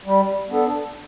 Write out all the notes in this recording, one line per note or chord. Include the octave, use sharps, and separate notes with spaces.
G3
B3 D4 A4